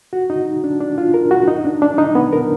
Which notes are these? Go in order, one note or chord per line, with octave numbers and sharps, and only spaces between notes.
F#4
D#4
D4
D4
F4
A#4
F#4
D#4
D4
D4
D#4
B3
A#4